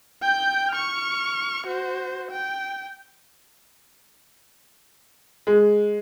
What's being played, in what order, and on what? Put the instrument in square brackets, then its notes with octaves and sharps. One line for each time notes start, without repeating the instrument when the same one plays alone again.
[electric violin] G5 G6
C#6 F6
F#4 C5
G5
[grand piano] G#3